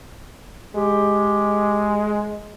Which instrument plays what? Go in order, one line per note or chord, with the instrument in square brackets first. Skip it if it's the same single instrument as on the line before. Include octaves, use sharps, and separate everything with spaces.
[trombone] G#3 [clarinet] G4